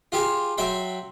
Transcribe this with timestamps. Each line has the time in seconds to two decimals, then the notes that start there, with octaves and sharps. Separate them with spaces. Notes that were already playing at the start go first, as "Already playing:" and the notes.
0.12 F4 G4 G#4
0.58 F#3 E5 G5 C6